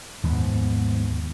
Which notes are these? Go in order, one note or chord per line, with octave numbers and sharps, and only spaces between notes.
D#2 G#2 F3 B3